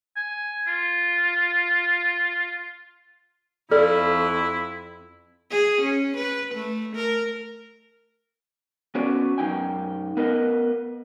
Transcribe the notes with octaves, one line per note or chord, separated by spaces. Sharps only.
G#5
F4
F2 E4 A4 D5
G#4
C#4
B4
A3
A#4
B3 C#4 F#4 B4 D5
F#2 C#3 D#4 G5 G#5
B3 A#4 B4 D#5